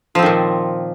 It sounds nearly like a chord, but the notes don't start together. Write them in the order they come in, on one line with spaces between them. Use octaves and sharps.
F3 C4 D#3 A#2